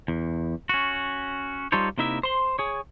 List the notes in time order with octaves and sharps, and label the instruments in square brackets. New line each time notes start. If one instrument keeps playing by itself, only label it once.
[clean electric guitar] E2
C#4 F#4
G3 D#4 F4 A4 C5 C#5
C3 A#3 D#4 E4 E5
C5 C6
G#4 C#5